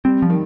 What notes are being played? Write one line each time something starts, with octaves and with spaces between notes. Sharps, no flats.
G3 C4
F3
D#3